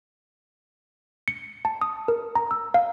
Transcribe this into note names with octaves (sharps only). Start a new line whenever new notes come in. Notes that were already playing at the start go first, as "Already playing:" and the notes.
C#7
A5
D#6
A#4
A#5
E6
F5